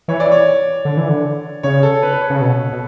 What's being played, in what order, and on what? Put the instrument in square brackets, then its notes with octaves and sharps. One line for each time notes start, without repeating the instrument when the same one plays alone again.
[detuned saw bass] E3 [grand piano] C#5
[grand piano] D5
C#5
[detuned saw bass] D3
E3
D3
[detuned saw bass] C#3 [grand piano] C#5
[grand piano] A4
B4
B4
C#5
[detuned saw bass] C#3
B2
B2